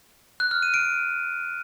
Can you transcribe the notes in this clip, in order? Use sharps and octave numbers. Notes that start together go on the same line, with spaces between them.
F#6
F6
D#7
D7